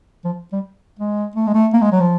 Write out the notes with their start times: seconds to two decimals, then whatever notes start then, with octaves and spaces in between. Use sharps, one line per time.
0.25 F3
0.53 G3
0.99 G#3
1.36 A3
1.47 G#3
1.54 A3
1.74 A#3
1.82 G#3
1.92 F#3
2.00 F3